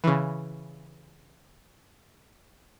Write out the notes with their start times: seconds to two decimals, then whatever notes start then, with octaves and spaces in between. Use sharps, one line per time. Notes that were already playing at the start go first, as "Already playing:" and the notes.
0.04 C#3 E3